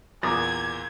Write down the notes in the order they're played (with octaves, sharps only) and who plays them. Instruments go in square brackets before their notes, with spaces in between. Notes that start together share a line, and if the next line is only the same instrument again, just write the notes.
[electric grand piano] E2 A#2 [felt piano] A#5 D6 A6 [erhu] G#6